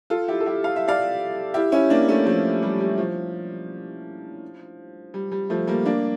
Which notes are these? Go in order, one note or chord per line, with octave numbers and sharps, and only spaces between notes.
F4 A4
E4 G4
A4
E4 G4
F5
E5
D5 F5
E4 G4
C#4 E4
A#3 D4
A3 C#4
F3 A3
G3
G3
F3
G3
G3
F3 A3
G3 A#3
A#3 D4